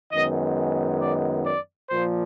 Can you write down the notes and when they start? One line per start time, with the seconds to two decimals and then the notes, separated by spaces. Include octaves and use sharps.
0.12 F#2 D#3 G#3 B3 D#5
1.01 D5
1.46 D5
1.90 A#2 F3 A#3 C5